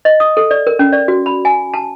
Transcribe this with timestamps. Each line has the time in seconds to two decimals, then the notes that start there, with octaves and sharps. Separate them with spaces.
0.05 D#5
0.20 D#6
0.37 A4
0.51 D5
0.67 A#4
0.79 C#4
0.93 D5
1.08 F#4
1.26 B5
1.45 G#5
1.74 A5